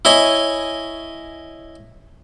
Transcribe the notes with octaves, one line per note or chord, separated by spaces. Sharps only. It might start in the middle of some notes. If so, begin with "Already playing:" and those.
E4 C#5 D#5 G#5